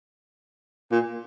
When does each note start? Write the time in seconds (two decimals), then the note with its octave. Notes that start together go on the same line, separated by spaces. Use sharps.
0.92 A#2